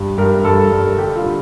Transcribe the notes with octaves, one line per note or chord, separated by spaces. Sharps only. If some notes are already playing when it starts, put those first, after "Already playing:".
Already playing: G2
G2 A#4
G2 A4
G2
D3 G4
F4
D3